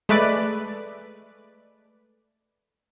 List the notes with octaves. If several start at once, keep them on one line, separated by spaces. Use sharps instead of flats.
G#3 A3 B4 D5